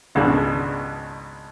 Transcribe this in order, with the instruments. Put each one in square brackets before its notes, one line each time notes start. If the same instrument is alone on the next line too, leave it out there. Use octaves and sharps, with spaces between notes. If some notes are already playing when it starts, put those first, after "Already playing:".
[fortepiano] G#1 C#2 B2 G#3 D4 F#6